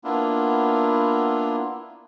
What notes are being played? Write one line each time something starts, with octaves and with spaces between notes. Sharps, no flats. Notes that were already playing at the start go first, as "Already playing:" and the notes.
A#3 B3 D4 E4 F4